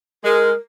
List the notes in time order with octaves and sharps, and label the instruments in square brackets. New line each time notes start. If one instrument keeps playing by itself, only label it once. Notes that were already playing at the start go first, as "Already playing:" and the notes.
[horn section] G#3 [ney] A#4